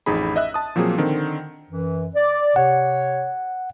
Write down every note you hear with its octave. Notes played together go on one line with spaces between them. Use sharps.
A1 F2 D#4 G#4 B5
D#5 E5 F#6
A5 D#6
A#2 F3 F#3 A#3 C4 G#4
D3 D#3 C4
F#2 E3
D5
C3 C#5 F#5